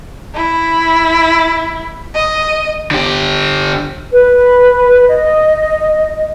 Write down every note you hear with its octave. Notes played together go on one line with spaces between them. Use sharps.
E4
D#5
D3 G4
B4
D#5